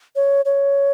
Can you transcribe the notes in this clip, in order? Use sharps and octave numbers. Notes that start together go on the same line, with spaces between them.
C#5
C#5